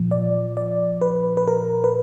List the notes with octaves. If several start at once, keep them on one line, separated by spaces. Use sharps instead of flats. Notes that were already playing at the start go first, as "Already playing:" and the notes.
Already playing: A#2 F3
D5
D5
B4
B4
A#4
B4